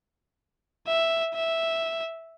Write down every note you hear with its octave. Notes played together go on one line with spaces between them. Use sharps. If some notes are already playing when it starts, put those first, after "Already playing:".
E5
E5